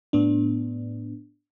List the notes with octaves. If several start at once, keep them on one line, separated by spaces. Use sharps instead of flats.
A2 B3 D4